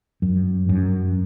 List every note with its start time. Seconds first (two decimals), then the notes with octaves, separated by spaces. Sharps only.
0.22 F#2
0.69 F#2